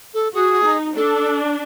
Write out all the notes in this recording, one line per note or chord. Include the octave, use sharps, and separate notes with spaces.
A4
F#4 G#4
D#4
D4 A4